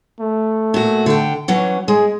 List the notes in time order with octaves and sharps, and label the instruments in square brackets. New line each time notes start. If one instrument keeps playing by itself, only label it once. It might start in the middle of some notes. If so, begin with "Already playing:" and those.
[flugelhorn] A3
[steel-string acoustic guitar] A#2 F#4
D3 G5
E3 F#3 C#4
[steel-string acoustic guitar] G#3 [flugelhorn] G#4